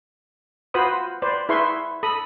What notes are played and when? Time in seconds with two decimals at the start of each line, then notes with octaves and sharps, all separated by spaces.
0.74 F4 F#4 B4 C5 B5 D#6
1.22 B4 C5 D5
1.49 E4 G#4 B4 E5 C6 C#6
2.03 A4 B5 D#6